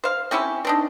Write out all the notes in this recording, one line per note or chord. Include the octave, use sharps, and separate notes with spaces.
C5 F5
C4 C#4 E4 G4
C4 D4 D#4